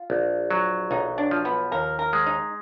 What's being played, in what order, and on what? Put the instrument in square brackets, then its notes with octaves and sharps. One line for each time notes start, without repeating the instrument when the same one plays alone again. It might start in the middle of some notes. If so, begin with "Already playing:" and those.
Already playing: [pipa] F4
[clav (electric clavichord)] A#1
F#3
[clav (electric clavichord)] B1 [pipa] D#4
[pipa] D4
[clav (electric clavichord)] F3
[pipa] B3
[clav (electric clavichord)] D#2 [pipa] A#4
[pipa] A#4
[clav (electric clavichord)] G#3
[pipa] D#4